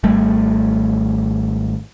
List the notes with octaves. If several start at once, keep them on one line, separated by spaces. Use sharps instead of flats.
G#1 G3 A3